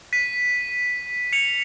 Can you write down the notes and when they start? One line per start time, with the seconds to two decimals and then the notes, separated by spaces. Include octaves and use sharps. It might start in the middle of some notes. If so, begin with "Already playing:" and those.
0.13 B6 D#7
1.33 C#7 F7